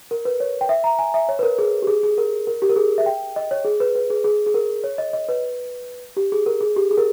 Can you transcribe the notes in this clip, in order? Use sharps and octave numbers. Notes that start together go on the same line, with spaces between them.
A#4
B4
C#5
G5
E5
A#5
G#5
E5
C#5
B4
A#4
G#4
G4
G#4
G#4
A#4
A#4
G4
A#4
G#4
E5
G5
D#5
C#5
G#4
B4
B4
G#4
G#4
G#4
A#4
C#5
D#5
D#5
B4
G4
G#4
A#4
G#4
G4
G#4
A#4